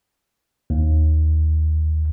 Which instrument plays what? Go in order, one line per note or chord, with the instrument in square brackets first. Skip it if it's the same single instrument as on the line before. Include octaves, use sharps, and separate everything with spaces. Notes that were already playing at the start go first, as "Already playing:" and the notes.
[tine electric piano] D#2